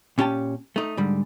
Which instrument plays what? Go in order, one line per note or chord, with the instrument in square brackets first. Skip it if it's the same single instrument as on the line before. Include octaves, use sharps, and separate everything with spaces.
[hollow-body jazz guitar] A#2 C#4 G4 G5 A5
A3 D#4
G#2 D3 G3